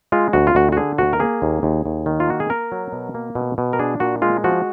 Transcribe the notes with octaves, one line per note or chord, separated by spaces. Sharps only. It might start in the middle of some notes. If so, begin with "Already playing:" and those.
G#3 F4
D2 F#4
F4
D2 F#4
F#4
D3 G#4
D2 F#4
A#4
A#3 G#4
D#2
D#2
D#2
D#3
F4
A#3 F#4
G#4
A#3 A#4
F#3
B2
A#3
B2
B2
A#4
D4 G#4
A#2 F#4
G#3 F4
F3 F#4